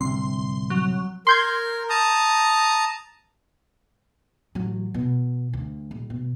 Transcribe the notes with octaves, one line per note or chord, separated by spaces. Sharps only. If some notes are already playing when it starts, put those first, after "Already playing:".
D1 C2 C4 C6
F#3
A#4 C6 G6 G#6
A5 A#5 D#6
A1 F#3
B2
D2
D#1
B2